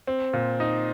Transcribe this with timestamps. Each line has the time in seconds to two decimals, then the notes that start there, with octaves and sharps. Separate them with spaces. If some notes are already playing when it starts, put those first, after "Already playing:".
0.07 C4
0.33 A#2
0.60 D#4